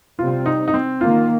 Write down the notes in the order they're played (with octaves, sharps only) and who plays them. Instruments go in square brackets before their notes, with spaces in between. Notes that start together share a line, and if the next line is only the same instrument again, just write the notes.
[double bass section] C3 G3 C4 [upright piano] F4
[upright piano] D#4
D#4
C4
[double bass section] D#3 A#3 [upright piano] F4